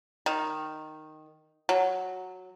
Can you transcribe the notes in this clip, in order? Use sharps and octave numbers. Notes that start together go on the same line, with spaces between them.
D#3
F#3